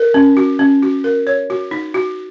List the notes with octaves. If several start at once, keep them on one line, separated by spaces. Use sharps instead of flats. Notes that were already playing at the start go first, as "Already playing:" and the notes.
Already playing: A#4
C#4
F#4
C#4
F#4
A#4
C#5
F#4
D#4
F#4